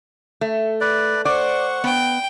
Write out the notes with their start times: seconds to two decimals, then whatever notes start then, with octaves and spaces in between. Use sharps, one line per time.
0.41 A3
0.81 B4 D5
1.25 C5 D5 F#5 C#6
1.84 B3 G5